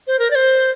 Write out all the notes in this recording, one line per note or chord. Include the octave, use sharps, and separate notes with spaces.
C5
A#4
D5
C5